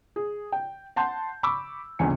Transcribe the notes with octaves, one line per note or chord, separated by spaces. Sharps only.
G#4
G5
F#5 A5 C6 G6
B5 C#6 D6 E6
G1 C#2 C3 E3 G#5 C#7